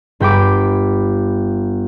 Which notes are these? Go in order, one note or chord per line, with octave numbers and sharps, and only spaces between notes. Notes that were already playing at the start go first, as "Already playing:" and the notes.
G1 G5 B5 D6